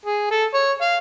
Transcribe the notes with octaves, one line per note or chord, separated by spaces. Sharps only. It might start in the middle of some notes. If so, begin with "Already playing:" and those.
G#4
A4
C#5
F5